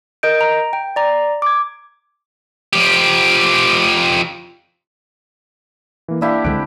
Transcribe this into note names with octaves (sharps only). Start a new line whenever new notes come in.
A#4 D#5 G6 D7
A#5
G5
D5 A#5
D6 G#6
F3 G4
E3 A#3
A#3 D4 E4 G4 F5
C#2 D3 G#3 C4 F#6 D7